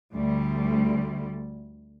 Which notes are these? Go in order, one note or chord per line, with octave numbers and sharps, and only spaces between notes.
D2 G3